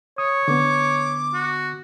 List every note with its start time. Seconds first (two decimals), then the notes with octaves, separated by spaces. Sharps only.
0.18 C#5 D#6
0.48 D3 B3 D6
1.34 F#4